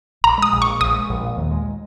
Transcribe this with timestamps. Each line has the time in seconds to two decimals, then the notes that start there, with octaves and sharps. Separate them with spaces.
0.24 A#1 A#5
0.38 G#3 D#6
0.52 A#1
0.62 A#2 C#6
0.80 A#1 D#6
0.94 G#3
1.09 A#1
1.23 A#2
1.37 D#2
1.51 G#3